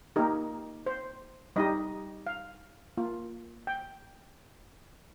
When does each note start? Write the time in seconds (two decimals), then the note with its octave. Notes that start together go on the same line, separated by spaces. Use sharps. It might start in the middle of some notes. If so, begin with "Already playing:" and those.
0.16 A#3 D#4 G4 A#4
0.86 C5
1.56 G3 D#4 G4 D#5
2.27 F5
2.97 A#3 F4
3.67 G5